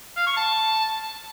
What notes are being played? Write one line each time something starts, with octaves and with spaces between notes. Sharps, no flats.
F5
C#6
A5